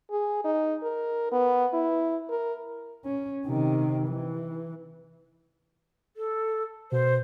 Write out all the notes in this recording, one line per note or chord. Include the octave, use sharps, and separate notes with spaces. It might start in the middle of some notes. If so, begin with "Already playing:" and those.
G#4
D#4
A#4
B3
E4
A#4
C#4
C3 D#3
E3
A4
B2 C5